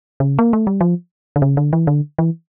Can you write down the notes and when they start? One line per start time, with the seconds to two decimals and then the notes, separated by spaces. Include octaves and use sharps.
0.20 C#3
0.39 A#3
0.53 A3
0.67 G3
0.81 F3
1.36 D3
1.42 C#3
1.57 D3
1.73 E3
1.87 D3
2.19 E3